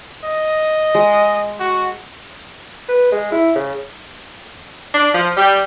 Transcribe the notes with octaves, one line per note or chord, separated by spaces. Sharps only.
D#5
G#3
F#4
B4
G#3
E4
C#3
D4
F3
G3